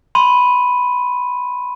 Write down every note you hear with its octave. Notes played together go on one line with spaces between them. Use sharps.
B5 C6 D#7